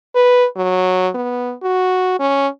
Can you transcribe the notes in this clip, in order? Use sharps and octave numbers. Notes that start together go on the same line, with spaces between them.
B4
F#3
B3
F#4
C#4